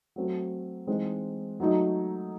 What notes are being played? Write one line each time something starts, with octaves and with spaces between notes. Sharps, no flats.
F#3 A3 C4
E3 G#3 C4 D#4
F#3 A3 D#4